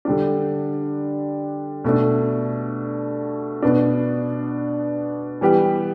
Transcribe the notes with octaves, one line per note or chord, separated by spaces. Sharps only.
D3 G3 D4
B2 A3 D4
B2 B3 D4
E3 G3 B3 G4